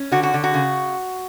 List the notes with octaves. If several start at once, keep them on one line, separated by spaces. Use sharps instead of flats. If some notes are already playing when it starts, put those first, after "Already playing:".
Already playing: C#4
D3 F#4
F#4
D3
F#4
C#3